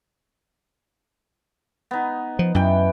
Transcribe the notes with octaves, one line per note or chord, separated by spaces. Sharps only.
B3 D#4
F3
F#2 E3 G5